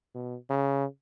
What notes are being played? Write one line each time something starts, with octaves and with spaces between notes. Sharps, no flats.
B2
C#3